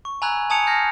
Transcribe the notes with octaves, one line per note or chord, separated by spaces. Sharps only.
C#6
G#5 A#5 B5 E6 F#6 G#6
G#5 A5 D#6 G#6 C#7 F7
F6 G6 A#6 C7